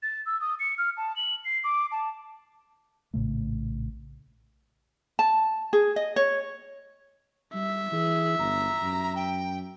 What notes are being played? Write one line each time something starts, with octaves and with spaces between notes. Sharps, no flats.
A6
E6
D#6
C#7
F6
A5
F#7
C7
D6
A5
A#1 A2 C#3 A3
A5
G#4
D#5
C#5
G3 E5
E3 G#4
G1 A#5
F#2
G5